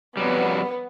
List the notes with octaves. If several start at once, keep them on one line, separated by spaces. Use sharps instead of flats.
F2 F#3 G3 B3